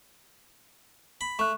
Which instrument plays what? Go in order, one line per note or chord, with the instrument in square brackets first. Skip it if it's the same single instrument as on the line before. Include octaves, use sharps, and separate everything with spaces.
[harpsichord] B5
[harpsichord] A3 [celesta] C#6 F#6